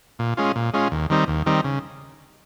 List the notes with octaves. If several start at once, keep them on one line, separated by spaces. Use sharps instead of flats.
A#2
G#3 C#4 F4
A#2
G#3 C#4 F4
D#2
D#3 G3 C4 D#4
D#2
D#3 G3 C4 D#4
C#3